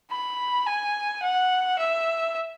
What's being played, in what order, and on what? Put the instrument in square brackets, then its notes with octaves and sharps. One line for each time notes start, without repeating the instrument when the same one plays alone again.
[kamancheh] B5
G#5
F#5
E5